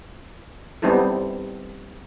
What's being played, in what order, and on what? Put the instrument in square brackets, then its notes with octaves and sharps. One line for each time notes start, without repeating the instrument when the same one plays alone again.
[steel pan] G3 B3 C4 D#4 E4 A4